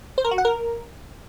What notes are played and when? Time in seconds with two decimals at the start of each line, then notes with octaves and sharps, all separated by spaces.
0.18 C5
0.24 A#4
0.31 F#4
0.38 F#5
0.45 A#4